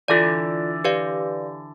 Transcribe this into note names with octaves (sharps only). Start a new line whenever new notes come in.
D3 E3 F4 A4 D5
G4 B4 D5 F5